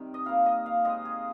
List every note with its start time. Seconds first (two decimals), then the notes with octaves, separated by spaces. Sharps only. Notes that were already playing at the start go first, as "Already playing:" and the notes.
Already playing: C3 D#3 G3 C4
0.14 D#5
0.25 A#2 G3 A#3 F5
0.46 D#5
0.66 F5
0.85 A#2 G#3 C4 D#5
1.05 G#4